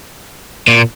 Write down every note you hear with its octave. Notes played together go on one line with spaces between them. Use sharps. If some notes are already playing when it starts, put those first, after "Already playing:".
A#2